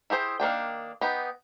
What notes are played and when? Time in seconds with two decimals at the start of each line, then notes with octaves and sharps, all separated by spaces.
0.10 E4 G4 G#4 C5
0.40 D#3 A#3 D4 G5
1.01 B3 D#4 G4